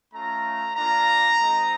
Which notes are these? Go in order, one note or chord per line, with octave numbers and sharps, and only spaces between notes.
A3 C#4 F4 A#5
A#3 D4 F4 A#5
G#3 C4 D#4